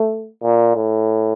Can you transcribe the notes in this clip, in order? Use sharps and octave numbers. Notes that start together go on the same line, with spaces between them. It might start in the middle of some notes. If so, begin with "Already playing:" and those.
Already playing: A3
A#2
A2